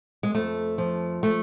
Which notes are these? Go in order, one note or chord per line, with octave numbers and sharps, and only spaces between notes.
G#3
F2 A3
F3
A3